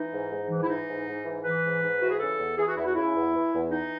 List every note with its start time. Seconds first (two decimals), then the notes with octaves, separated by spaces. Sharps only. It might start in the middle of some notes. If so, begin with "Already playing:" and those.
Already playing: E3 D#4
0.12 G#2
0.31 G#2
0.50 E3
0.62 E4
0.69 E3 D#4
0.88 G#2
1.07 G#2
1.25 E3
1.44 E3 B4
1.64 G#2
1.82 G#2
2.01 E3 F#4
2.10 G#4
2.20 C#3 A4
2.38 E2
2.57 E3 G#4
2.67 F#4
2.76 E2 E4
2.86 F#4
2.95 C#3 E4
3.15 E2
3.34 E3
3.53 E2
3.71 E3 D#4